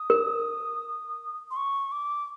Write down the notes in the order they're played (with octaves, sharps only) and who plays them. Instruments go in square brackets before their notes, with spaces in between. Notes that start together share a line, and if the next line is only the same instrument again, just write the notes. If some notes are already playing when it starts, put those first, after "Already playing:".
Already playing: [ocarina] D#6
[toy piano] A#4
[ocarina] C6
C#6
D6